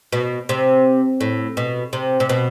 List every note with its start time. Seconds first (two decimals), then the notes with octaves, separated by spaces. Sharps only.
0.13 B2
0.49 C3
1.21 A2
1.57 B2
1.93 C3
2.20 C3
2.29 B2